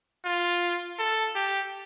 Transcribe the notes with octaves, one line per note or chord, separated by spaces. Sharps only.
F4
A4
G4